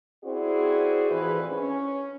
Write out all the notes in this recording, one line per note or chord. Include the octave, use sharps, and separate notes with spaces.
C4 E4 F#4 G#4 C5 D5
F2 A2 E3 G#4 B4
C#4